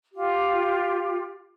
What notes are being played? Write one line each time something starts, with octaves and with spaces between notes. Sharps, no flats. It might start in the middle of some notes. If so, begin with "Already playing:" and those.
F4 G4